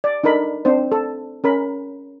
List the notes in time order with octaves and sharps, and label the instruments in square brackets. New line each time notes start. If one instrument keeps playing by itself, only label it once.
[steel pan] D5
D4 D#4 A4 A#4 B5
C4 D4 C5
A4
C#4 A#4 B5